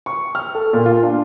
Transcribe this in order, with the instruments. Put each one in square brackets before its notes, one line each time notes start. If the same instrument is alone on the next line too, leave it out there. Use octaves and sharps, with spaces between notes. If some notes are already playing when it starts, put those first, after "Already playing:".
[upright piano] C#6
F6
A4
A#2
F4
D4